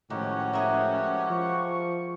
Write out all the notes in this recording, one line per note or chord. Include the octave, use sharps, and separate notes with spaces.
A2 D#3 F3 G#3 C#4 F#4 G4 F#5
G#4 A#4 E5
F3 C#6